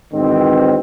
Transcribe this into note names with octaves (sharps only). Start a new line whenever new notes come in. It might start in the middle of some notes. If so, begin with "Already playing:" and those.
G#2 B2 D#3 E3 C4